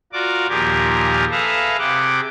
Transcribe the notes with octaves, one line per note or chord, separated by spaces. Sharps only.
F4 F#4 A#4 D5 D6
D#2 A#2 F3 G4 G#4 A#4
G#4 A4 B4 E5 F5 A#5
C3 G#4 F#5 G5 D6